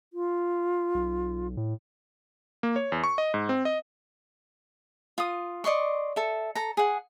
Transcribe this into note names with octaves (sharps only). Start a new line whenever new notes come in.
F4
B1
A2
A#3
C#5
E2
C#6
D#5
G#2
C4
D#5
F4 D#6
D5 D#5 C6 C#6
A4 E5
A4 A#5
G#4 F#5